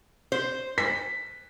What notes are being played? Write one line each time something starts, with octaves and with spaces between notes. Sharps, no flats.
C5
B6